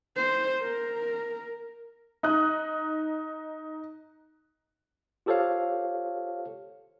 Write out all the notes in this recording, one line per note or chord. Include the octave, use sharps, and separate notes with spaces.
C5
A#4
D#4 D#6 F#6
F4 G4 A4 C5 C#5 F5